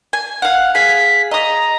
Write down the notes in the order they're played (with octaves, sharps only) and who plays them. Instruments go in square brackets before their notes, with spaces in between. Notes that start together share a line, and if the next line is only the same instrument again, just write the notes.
[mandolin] G#5
F5 F#5
[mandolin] G#4 F5 [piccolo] B6
[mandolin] D#5 D#6 [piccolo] A#5